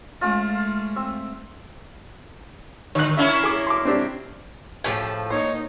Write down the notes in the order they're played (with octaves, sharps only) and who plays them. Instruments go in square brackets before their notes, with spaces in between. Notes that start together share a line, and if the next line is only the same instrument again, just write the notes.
[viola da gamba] G#3 A3 [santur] C#4 F4
[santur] C4 E5
[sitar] D3 [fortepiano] C#5 F#6
[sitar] A#3 C#4 E4 [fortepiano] E5
[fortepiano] G#4 D6
C6 D6
C4 D4 G4
[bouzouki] A2 F3 [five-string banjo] C#4 G4 G#4
[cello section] A#2 A#3 D#4 [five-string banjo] C5 [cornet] C#5